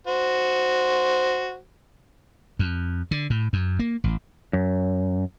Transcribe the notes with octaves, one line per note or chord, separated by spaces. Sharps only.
F#4 C5
F2
D3
A2
F#2
A#3
A1
F#2